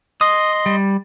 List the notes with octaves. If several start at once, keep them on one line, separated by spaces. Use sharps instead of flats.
D#5 C6 D#6
G3